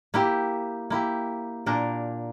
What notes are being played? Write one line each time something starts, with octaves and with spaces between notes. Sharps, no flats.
A#3 E4 G4
A#3 E4 G4
A#2 A#3 D4 A#4